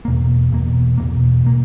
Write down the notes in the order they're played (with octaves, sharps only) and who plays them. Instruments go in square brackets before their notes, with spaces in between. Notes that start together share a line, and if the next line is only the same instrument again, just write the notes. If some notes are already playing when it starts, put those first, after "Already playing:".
[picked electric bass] E2 B2 A#3
E2 B2 A#3
E2 B2 A#3
B2 A#3